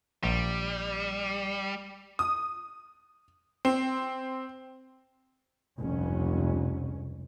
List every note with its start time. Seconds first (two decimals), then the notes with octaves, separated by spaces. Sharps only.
0.24 A#1 G3
2.19 D#6
3.65 C4
5.80 F1 C#2 G2 C#4